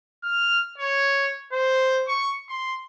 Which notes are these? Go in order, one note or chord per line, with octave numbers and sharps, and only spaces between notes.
F6
C#5
C5
C#6
C6